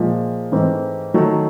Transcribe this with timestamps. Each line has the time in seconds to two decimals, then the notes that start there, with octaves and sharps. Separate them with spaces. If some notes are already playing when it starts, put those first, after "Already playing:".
Already playing: A#2 F3 G#3
0.52 G#2 E3 A3 C4
1.14 D#3 F#3 A3